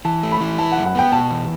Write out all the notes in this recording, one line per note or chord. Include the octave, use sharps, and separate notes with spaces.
E3 A5
A3
B5
E3
E4 A5
F#2 F#5
F#5
B3 G5
B2 A5
E2